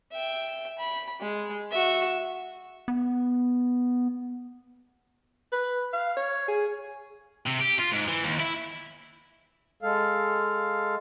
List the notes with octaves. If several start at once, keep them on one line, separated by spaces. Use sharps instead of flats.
E5 G5
B5
G#3
F#4 E5
B3
B4
F5
C#5
G#4
C3
G4
F4
G#2
E3
D#2
E4
G#3 A4 F5